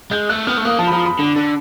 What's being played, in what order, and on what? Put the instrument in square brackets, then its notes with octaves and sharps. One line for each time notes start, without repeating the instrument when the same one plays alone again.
[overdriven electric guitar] G#3 [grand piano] G6
[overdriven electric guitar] A3 [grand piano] F#6
[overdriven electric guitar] B3 [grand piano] F6
[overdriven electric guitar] A3
[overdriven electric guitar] A#3 [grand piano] D#6
[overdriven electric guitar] F3 [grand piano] A5
[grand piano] B5
[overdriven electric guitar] F3 [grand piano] A#5
[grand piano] B5
[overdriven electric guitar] D3
D3